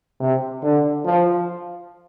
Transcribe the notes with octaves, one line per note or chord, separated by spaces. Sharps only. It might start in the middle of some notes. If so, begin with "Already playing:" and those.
C3
D3
F3